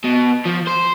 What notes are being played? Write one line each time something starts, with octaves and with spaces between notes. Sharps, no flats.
B2
F3
C5